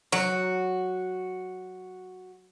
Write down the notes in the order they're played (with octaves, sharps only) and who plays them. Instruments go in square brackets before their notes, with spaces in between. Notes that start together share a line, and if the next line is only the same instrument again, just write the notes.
[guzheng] F#3 [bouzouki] F#4